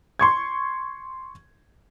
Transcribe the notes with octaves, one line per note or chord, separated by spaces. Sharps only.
C6 C#6 G#6